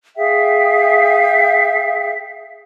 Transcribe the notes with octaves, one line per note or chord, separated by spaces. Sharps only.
G#4 E5 F5 G5